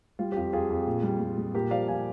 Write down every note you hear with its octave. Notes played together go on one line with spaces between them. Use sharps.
G3 F4
G4
F2 F4
F2 F4 G#4
F2
A#2
G3
G3
G3
A#2 G4 A#4
F3 D5 F5
F3 F5 G#5